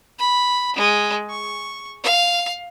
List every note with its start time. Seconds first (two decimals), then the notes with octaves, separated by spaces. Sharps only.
0.19 B5
0.76 G#3
1.30 C#6
2.04 F5